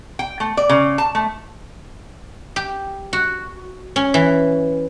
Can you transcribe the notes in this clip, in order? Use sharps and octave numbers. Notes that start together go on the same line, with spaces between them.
G5
A3
D5
C#3
A5
A3
G4
F#4
C#4
E3